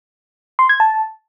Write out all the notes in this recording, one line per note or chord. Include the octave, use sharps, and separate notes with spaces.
C6
G#6
A5